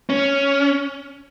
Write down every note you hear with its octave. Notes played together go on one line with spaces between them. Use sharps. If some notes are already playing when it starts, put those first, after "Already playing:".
C#4